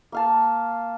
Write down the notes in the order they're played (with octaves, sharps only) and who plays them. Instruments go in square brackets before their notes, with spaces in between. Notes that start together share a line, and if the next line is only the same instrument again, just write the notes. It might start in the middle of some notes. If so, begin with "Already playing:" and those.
[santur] A#3 F5 A5